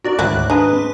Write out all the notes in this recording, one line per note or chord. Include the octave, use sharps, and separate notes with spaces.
D#4 F#4 A#4 D5
D2 G#2 D#3 F#3 E4 F#6
G#3 D4 B4 A#5 D#6
C4